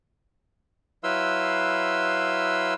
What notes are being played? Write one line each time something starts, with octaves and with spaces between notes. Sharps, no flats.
F#3 E4 B4 F5 C6 E6